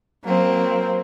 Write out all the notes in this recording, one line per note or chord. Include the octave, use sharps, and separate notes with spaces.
F#3 A#3 C4